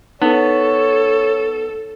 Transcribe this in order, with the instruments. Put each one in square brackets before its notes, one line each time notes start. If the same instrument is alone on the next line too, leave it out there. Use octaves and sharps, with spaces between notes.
[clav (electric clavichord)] B3 [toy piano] D#4 [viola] A4 [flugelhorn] C#5